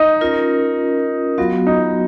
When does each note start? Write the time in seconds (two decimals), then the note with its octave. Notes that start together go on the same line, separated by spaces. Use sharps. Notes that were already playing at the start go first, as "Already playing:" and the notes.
Already playing: D#4
0.21 C#4 F4 A#4
1.38 F#3 B3 F4 F#4
1.67 D#4